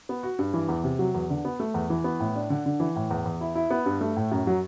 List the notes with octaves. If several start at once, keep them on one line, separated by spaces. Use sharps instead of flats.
B3
F#4
G2
E3
E2
C3
F#3
E2
D3
B3
A3
E2
E3
B3
A2
D4
D3
D3
E3
A2
E2
E2
E4
E4
B3
G2
A3
A2
F#2
F#3